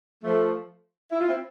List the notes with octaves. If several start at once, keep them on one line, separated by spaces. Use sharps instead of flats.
F3 A3
E4
F4
C4 E4